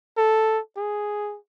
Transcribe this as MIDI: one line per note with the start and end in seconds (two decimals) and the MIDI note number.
0.17 0.59 69
0.77 1.37 68